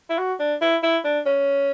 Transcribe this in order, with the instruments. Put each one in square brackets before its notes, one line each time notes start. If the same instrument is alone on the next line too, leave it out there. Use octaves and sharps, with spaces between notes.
[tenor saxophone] E4
F#4
D4
E4
E4
D4
C#4